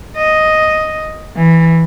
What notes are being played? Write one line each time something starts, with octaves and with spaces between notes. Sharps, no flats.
D#5
E3